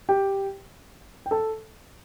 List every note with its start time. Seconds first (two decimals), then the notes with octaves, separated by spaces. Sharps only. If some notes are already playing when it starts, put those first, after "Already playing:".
0.09 G4 G5
1.26 G5
1.31 A4 A5